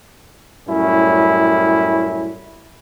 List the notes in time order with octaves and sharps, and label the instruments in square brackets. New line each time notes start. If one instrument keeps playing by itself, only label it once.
[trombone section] F#2 A2 G3 C#4 E4